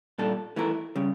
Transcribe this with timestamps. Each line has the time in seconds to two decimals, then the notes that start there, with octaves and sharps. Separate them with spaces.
0.18 A#2 G3 D4 A4
0.56 E3 A3 E4 A#4
0.96 C#3 G3